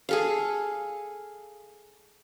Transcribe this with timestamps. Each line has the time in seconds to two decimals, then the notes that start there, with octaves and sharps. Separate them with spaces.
0.09 G#4 A4 F5